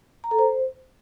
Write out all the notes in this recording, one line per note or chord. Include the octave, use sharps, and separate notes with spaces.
A#5
A4
C5